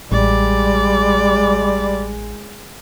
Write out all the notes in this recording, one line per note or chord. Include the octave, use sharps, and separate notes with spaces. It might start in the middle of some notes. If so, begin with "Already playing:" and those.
A1 G3 G#3 D5